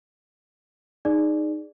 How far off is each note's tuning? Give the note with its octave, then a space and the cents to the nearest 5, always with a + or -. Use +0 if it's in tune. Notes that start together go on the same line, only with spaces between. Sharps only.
D#4 -10 G#4 +0 D5 +5